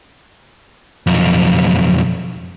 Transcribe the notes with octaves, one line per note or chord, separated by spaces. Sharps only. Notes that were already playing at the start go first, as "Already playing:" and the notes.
B1 F2